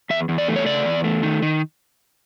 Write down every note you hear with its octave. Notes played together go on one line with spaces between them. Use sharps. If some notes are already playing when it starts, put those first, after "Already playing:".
E2 E5
E2
D5
A3
C#5
C#3 D5
E2
A3
D#3
D#3